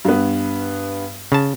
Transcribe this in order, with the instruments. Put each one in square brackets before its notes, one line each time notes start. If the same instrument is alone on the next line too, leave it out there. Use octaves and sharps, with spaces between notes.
[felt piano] G2 B3
[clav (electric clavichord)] C#3 A5